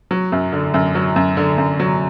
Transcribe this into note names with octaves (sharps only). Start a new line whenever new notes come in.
F#3
F#2
D3
F#2
F#3
F#2
D3
F#2
F#3